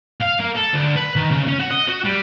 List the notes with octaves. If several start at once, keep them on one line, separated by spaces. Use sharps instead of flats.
F5
A#3
A4
D2
B4
D#3
C#3
C#4
F#4
D#5
F#4
G3